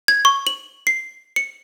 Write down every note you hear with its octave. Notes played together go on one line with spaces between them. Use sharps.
G#6
C#6
F#7
C7
C#7